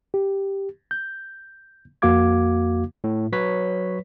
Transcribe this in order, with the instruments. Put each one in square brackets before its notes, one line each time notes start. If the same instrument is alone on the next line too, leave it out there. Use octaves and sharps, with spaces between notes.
[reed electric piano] G4
G6
F2 A#3 F#4 F5 D6 G#6
[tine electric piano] A2
F#3 B4 C#5 B6